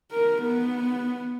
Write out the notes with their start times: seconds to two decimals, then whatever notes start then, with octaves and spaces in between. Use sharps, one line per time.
0.12 A#4
0.42 B3